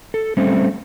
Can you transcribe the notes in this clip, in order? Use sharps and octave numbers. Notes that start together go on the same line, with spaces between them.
A4
G3 A3 C4 C#4